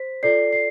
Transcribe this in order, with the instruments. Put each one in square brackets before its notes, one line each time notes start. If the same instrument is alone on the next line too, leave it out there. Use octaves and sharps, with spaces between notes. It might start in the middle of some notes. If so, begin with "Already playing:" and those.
Already playing: [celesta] C5 B6
F4 A4 D5 C7
C7